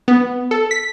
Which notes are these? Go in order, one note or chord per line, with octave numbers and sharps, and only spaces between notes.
B3
A4
B6